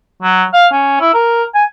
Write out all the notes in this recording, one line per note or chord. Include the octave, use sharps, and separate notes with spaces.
F#3
F5
C#4
E4
A#4
G#5